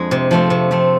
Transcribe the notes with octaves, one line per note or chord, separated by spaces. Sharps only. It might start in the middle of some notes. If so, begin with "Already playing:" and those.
Already playing: F2 G#3 D4
C3
F3 A3 C4
C3
F3 A3 C4